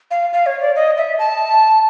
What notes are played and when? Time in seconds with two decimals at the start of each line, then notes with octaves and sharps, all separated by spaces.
0.11 F5
0.33 F5
0.46 C#5
0.61 D5
0.76 D#5
0.97 E5
1.18 A5